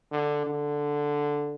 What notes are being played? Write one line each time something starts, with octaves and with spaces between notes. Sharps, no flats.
D3
D3